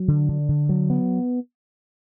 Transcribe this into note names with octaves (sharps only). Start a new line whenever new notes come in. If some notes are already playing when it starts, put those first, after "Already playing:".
Already playing: F#3
D3
D3
D3
F#3
B3